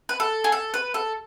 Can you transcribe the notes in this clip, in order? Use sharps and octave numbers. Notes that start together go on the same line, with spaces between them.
B4
A4
G#4
A4
B4
A4